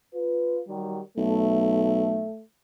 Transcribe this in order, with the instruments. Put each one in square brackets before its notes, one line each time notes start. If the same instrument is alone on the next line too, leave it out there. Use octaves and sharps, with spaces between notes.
[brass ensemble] F4 B4
D#3 F#3 G3
[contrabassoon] B1 [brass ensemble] A3